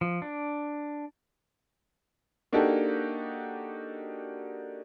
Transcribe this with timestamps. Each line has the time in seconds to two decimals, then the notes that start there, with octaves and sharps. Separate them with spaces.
0.01 F3
0.22 D4
2.53 A#3 D4 D#4 F#4 G4 A4